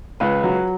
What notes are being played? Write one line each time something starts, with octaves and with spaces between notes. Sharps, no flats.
C#2 B4
F#3